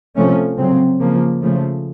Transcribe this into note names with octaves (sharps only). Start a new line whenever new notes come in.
C3 F3 A3 C#4
C#3 F#3 C4
C#3 F3 A#3
C#3 F3 A3